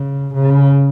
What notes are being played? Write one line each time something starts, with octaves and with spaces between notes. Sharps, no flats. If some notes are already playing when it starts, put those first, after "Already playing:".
Already playing: C#3
C#3